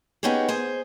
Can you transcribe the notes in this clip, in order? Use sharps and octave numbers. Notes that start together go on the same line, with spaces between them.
B3 C#4 D#4 G4 G#4
G#4 C5